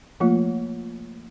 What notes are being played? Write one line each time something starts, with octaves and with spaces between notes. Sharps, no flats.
F3 A3 A#3 F4